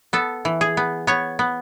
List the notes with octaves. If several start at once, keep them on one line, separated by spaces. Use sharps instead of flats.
B3 A4
E3
G#4
B3
B3 C#5
B3